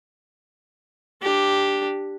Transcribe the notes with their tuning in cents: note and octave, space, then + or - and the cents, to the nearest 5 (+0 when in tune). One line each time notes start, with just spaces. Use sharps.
D4 +0 G4 +0